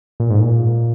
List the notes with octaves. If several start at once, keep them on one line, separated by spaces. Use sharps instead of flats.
A#2
G#2
A#2